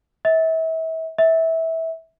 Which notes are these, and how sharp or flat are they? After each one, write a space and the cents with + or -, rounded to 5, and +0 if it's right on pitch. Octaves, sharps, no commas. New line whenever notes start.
E5 -35
E5 -20